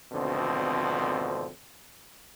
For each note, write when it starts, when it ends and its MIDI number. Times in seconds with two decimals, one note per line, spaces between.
0.12 1.48 32
0.12 1.48 38
0.12 1.48 47
0.12 1.48 50
0.12 1.48 53
0.12 1.48 60